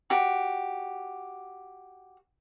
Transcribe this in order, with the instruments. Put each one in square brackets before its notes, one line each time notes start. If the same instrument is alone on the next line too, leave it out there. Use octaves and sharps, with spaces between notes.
[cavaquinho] F#4 G4